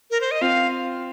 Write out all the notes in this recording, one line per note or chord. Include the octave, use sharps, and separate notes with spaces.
A#4
C5
D#5
C4 F4 F5